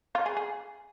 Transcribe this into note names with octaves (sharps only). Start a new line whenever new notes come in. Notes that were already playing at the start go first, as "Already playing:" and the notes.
F4
G#4
G#4